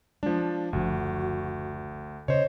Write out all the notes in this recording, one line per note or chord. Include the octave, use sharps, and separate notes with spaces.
F3 G#3 D4
F#1 D2 F3 F#4
C#3 C5 C#5 D#5